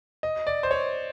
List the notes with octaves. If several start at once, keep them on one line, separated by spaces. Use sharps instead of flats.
D#5
D5
C5
C#5